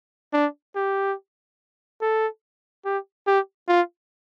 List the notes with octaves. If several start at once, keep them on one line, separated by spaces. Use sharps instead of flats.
D4
G4
A4
G4
G4
F4